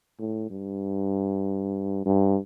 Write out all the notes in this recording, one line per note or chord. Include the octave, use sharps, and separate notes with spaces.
A2
G2
G2